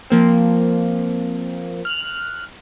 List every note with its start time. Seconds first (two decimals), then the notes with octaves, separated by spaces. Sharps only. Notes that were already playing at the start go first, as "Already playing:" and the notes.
0.10 F3 A#3 C4
1.85 F6 F#6